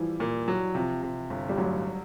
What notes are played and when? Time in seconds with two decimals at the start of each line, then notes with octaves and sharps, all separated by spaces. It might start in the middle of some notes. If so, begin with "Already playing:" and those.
Already playing: E3 F3 G3
0.20 A#2
0.48 F#3
0.75 C3 F3
1.03 C3
1.30 G1
1.49 G3
1.58 A1 F#3